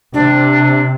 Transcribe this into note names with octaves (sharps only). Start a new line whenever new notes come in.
C3 D4